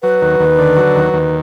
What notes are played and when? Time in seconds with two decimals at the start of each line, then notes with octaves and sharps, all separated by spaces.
0.02 F#3 B4
0.22 D#2
0.40 D#2
0.58 D3
0.77 F#3
0.96 D#2
1.14 D#2